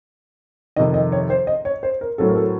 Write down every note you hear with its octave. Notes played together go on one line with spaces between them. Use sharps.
F2 C3 D#3 D#5
D#5
C#5
C5
D#5
C#5
C5
A#4
A2 F#3 C4 A4
A#4
A4